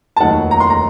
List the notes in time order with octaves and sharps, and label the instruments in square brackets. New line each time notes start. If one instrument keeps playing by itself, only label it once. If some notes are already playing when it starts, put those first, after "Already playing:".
[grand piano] A5
F1 D#2 D#3 F#3 F#5
A#5
C6
A#5